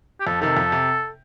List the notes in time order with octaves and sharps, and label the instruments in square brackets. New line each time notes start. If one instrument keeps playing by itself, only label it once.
[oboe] G4
[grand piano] F2 [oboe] A4
[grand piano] C3 D#3 [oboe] A4
[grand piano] F2
C3